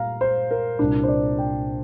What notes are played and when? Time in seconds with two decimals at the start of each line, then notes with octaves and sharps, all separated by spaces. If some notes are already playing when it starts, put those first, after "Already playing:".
Already playing: A#2 G3 F5 A#5
0.21 C5
0.51 A#4
0.79 C2 A#2 A#3 D4
1.03 C5
1.08 D5
1.38 G5